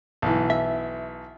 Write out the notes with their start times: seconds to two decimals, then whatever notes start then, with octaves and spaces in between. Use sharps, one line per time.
0.22 B1 E3
0.50 E5